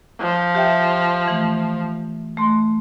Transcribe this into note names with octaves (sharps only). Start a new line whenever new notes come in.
F3
G4 E5 G5
E3 A3
A3 C6